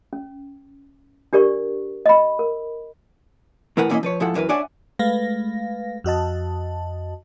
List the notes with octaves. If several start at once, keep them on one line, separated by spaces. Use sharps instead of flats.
C#4
D4 G4 A#4 D5 C#6
D#5 B5
A#4
A2 E3 E4 A#4 B4 F#5
E3 G3 A#3 C#4 E4 D#5
F3 B4 C#5
G#2 F3 E4 A4 F#5
F#2 E3 D4 A#4 B4
D4 C#5 D5 E5 F#5 G#5
G#3 A3 B4 F5 A#6
F2 F#4 D#5 A5